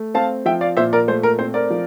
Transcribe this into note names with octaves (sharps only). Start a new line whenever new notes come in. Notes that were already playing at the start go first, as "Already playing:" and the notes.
Already playing: A3
C4 F5 A5
F3 E5 G5
D5 F5
A#2 C5 E5
A#4 D5
A3 C5
A#4
C4 C5
A#4 D5
F3